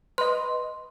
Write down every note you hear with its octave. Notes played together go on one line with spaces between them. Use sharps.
B4 D#5 C6